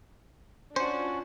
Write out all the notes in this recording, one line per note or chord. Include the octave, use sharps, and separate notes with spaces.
C#4 D4 F4 F#4 C5